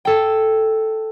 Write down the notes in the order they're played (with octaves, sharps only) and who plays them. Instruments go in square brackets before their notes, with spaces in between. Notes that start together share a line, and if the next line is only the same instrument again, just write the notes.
[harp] A4 G5